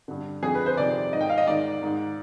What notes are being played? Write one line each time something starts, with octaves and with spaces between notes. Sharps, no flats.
G2 D3
F2 D3 G#4
B4
C5
F2 C3 D#3 D5
G#2 D#3 D#5
G5
F5
D#5
G#2 D#3 D5
G#2 D#3